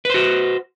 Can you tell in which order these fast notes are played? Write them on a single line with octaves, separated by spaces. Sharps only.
B4 C5 F#4